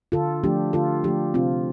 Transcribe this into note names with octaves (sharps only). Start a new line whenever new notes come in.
D3 F4 A4
F3 A3 D4 G4
D3 F4 A4
F3 A3 D4 G4
C3 C4 F4